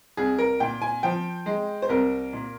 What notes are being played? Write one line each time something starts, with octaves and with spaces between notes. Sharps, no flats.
C2 G#4
A#4
A#2 G5
G#5
F3 G5
G#3
C5
C2 A#4
A#2